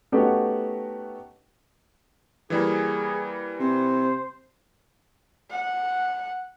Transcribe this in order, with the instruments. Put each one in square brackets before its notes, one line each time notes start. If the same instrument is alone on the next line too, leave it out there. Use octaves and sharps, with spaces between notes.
[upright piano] A3 B3 C#4 D#4 F#4 G4
[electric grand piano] E3 G3 A#3 [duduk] G#4
[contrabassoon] C3 [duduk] C5
[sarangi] F#5